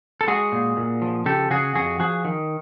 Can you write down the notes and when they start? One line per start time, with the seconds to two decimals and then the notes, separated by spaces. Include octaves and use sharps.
0.21 A4
0.27 G#3 F#4 G#4
0.52 A#2
0.77 A#2
1.02 F3
1.26 C#3 G4 A4
1.50 C#3 F#4 G#4
1.75 F2 F#4 G#4
2.00 F3 F#4 G#4
2.25 D#3